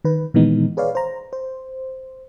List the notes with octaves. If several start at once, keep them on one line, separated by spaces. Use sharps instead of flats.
D#3 B4
A#2 D#3 E3 G#3 B3 D#4
G#4 B4 C#5 D5 F5
C5 A#5
C5